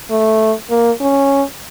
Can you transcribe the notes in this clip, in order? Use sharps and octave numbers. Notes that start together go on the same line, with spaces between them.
A3
A#3
C#4